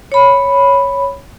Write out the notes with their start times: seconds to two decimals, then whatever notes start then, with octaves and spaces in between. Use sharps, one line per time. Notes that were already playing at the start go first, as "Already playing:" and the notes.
0.12 C#5 B5